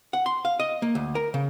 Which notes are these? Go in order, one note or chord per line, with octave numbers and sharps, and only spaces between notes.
F#5
C6
F5
D#5
A#3
D2
A#4
C#3